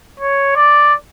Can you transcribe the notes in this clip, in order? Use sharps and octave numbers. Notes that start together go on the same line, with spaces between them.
C#5
D5